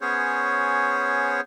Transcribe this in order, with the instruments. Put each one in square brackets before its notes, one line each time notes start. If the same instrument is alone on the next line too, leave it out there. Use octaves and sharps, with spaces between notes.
[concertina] B3 C#4 G#4 C5 C#5